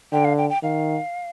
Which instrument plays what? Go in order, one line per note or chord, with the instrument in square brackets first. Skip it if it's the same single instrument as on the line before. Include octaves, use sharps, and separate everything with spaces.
[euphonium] D3 [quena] G5
[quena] F5
G5
G5
[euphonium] D#3 [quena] F5